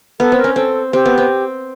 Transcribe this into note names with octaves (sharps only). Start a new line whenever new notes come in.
B3 A4
C4
A#4
C#4
C4 A4
C4 G4
B3
C4